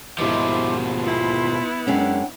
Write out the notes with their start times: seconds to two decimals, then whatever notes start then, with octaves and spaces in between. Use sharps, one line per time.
0.18 D#2 G#2 B2 F3 E4 C6 D6
1.02 B3 E4 F4 C6
1.87 F#2 G#3 C#4 D4 F#5 G5